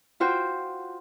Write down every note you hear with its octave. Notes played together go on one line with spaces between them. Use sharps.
F4 F#4 C5 G5